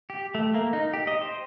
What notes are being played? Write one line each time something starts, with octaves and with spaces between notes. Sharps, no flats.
G4
A3
A#3
D#4
G4
D#5
C5